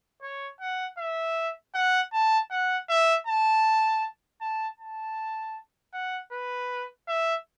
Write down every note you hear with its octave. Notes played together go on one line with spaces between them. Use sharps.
C#5
F#5
E5
F#5
A5
F#5
E5
A5
A5
A5
F#5
B4
E5